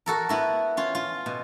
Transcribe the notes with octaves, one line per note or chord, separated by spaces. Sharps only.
F#4 A4 A#4
B3 E4 F#4
C#4 F4
F4
B2